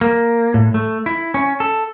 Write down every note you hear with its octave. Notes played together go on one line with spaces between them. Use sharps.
A#3
A2
A3
E4
C#4
A4